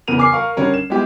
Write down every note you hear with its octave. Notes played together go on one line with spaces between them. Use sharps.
E2 C#3 B3 A#4 D#7 F7
G#5 D6 F6 C7
A#4 F5 C#6
D3 G3 C#4 A#4
E7
G#3 B3 E4 F4 G4